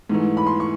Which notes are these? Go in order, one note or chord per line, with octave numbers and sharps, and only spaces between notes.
G#2 E3 A3
B5
C6
C#6